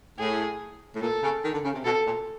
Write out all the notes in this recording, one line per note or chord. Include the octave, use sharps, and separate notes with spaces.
A2 G#4
A2
A#2 A4
C#3
D#3
D3
C#3
C3
B2 A4
A#2